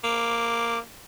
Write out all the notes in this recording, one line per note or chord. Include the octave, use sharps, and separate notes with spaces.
A#3 D6